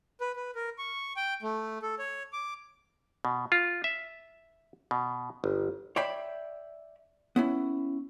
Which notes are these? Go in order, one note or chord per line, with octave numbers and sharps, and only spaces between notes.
B4
B4
A#4
C#6
G5
A3
A4
C#5
D6
B2
F4
E5
B2
G1
C#5 D5 E5 G5 B5
B3 C#4 E4